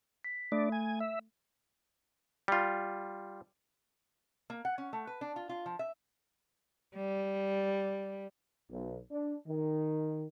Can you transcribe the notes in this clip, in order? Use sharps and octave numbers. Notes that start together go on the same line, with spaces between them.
B6
A3 D4 D5
G#5
E5
G3 F4
A#3
F#5
C#4
A3
B4
D4
F4
F4
F3
E5
G3
B1
D4
D#3